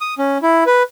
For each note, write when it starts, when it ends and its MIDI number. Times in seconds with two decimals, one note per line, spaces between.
0.01 0.15 87
0.18 0.38 61
0.43 0.64 64
0.66 0.83 71